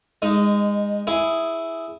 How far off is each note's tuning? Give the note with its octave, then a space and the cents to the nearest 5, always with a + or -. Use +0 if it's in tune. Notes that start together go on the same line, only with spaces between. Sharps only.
G#3 -20 D#4 +0
E4 +0 G#4 +0